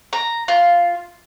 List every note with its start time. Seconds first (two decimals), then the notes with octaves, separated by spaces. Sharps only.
0.13 A#5
0.48 F4